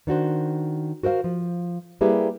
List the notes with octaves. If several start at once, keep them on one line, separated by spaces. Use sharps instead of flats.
D#3 D4 F#4 C5
F#4 A#4 C5 E5 F5
F3
G3 A#3 E4 G4 G#4 B4